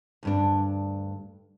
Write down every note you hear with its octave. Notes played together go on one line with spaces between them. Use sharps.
D2 G2 D4